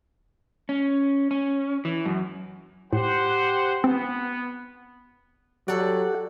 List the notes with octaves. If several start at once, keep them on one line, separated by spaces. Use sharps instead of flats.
C#4
C#4
E3
F#2
A2 G4 C5 F#5
B3 C4
F#3 G4 A4 D5 F#5